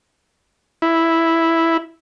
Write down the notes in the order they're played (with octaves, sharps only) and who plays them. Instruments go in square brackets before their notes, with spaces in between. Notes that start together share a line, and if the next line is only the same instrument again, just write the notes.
[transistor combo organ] E4